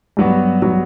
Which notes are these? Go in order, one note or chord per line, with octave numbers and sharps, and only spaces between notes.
G2 F#3 B3 F#4
F#3 B3 F#4